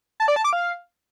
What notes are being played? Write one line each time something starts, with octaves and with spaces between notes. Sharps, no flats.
A5
D5
A5
D6
F5